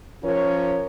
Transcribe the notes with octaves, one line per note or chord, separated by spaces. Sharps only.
F3 C#4 F4 A#4 C#5